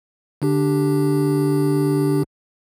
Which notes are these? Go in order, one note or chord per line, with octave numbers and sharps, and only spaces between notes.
D3 D4 G4